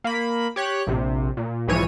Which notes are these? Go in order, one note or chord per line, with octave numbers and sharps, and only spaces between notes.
A#3 B5
G4 C#5 F#6
A#1 C3
A#2
B1 G#2 E3 F3 C#5 D#7